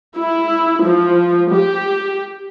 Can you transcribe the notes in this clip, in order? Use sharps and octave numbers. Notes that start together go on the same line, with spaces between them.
E4
F3
G4